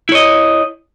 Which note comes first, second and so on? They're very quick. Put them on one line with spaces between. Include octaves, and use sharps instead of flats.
E4 C#5 D#5